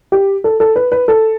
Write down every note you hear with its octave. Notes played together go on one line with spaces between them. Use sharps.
G4
A4
A4
B4
B4
A4